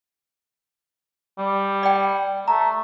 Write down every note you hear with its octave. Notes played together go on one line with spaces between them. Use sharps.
G3
D5 G5
A3 A#5